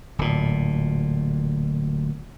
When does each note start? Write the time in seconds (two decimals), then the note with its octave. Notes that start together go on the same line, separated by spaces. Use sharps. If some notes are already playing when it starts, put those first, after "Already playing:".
0.18 D1 A#2